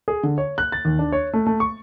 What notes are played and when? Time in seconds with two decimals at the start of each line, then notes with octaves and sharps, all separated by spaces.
0.08 G#4
0.23 D3
0.38 C#5
0.58 F#6
0.72 A6
0.85 D#2
0.99 D4
1.12 C#5
1.33 A3
1.46 A3
1.60 C#6